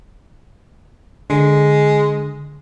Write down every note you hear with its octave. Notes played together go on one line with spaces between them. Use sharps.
D3 G#3